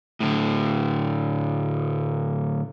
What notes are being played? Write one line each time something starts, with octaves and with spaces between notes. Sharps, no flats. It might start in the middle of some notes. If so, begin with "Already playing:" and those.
A2 D3